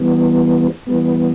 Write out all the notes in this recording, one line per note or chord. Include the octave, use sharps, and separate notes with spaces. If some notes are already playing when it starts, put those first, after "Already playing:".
Already playing: E3 G3 B3
E3 G3 B3